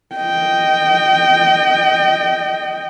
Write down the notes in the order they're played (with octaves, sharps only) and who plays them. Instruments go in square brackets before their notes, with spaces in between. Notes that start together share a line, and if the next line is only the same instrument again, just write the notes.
[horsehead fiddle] D#5 G5